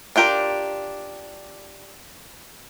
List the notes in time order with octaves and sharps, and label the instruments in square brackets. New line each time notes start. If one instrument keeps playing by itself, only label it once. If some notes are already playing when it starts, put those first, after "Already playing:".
[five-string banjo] D4 F4 G4 A#4